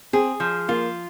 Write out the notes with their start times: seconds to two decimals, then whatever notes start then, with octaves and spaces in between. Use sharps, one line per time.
0.13 C4 G#4
0.40 F3
0.68 A#3 F4